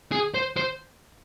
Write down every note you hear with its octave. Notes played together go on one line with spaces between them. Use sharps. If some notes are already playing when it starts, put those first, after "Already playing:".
G#4
C5
C5